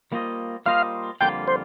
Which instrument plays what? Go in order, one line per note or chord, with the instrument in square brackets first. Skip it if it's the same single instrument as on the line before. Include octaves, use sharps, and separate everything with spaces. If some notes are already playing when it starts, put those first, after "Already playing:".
[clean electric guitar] G3 A#3 F4 C5 D#5
[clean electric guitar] G3 A#3 F4 C5 D#5 [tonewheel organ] F5
[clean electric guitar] F2 D3 G3 A#3 F4 [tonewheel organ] G5
[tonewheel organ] C5